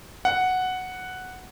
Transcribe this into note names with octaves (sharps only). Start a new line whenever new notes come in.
F#5